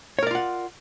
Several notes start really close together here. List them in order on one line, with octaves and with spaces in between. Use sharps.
C#5 A#4 D5 F4 F#5